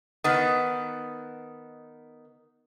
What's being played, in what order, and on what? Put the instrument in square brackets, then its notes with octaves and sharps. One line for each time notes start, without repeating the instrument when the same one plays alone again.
[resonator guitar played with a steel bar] D#3 B3 [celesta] D#6 A6 D#7